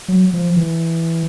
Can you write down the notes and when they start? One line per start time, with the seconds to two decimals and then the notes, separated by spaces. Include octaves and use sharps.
0.08 F#3
0.33 F3
0.56 E3